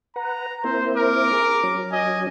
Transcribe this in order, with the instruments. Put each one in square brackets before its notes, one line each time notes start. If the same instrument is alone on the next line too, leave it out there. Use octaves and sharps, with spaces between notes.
[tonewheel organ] B4 F#5 [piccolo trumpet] A#5
[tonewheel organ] A#3 C4 E4 [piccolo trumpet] C5
[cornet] A#4 [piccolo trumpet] D6
[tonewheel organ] G#4
F#3 C#4
[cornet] D#5 [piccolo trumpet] G#5